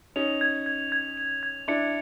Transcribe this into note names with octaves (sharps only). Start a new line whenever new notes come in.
C#4 D#4 F7
G#6
G#6
G#6
F7
G#6
D4 E4 C#7